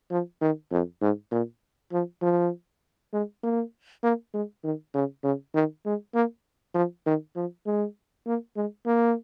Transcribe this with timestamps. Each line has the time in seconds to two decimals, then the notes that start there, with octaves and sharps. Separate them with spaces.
0.11 F3
0.41 D#3
0.71 F2
1.01 G#2
1.32 A#2
1.92 F3
2.22 F3
3.13 G#3
3.43 A#3
4.04 A#3
4.34 G#3
4.64 D#3
4.94 C#3
5.24 C#3
5.55 D#3
5.85 G#3
6.15 A#3
6.75 F3
7.06 D#3
7.36 F3
7.66 G#3
8.27 A#3
8.57 G#3
8.86 A#3